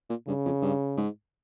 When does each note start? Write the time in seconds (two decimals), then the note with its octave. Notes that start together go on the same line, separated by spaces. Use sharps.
0.09 A#2
0.27 G2 C#3
0.45 F2
0.62 G2
0.97 G#2